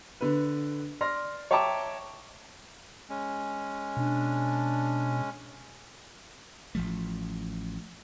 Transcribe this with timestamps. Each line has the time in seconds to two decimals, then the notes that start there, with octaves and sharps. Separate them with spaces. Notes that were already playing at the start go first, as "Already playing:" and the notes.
0.21 D3 B4
1.01 D5 C6 F6 A#6
1.51 C#5 E5 G5 A5 A#5 D6
3.09 G#3 C#4
3.97 B2 D4
6.75 A1 F3 A3